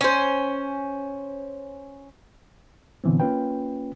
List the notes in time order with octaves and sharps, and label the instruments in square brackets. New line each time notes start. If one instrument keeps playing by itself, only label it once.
[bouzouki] C#4 C5
[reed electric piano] A#2 D3 E3 B3 C4
A#3 C#4 F4 B4 G5